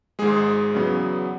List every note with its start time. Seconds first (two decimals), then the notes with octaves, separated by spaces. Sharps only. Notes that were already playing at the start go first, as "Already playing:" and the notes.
0.19 G#1 G#2 G#3 G#4
0.74 E2 C#3 F#3 B3